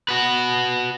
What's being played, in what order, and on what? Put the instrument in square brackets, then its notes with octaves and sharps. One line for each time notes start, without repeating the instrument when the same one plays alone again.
[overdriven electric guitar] F#4 B4